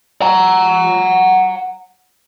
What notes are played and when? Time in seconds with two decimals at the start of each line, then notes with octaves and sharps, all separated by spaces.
0.22 F#5 A#5